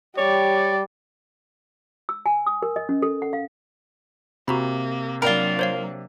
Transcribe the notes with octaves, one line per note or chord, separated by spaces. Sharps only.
G3 C#5 D5
E6
G#5
D#6
A#4
D#5
C#4
A4
F#5
F5
C3 A#3 F#4 A#5 B5
F#3 A#3 D4 F4 A#4 D5 G5 B5
C5 C#5 F5